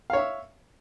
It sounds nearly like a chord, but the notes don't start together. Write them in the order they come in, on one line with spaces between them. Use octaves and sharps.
F5 C#5 E5